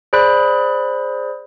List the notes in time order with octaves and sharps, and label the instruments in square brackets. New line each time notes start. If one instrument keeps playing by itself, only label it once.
[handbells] G#4 C5 D5 B5 F#6